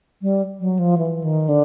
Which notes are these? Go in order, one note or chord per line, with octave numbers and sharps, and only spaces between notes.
G3
F#3
F3
E3
D#3
D3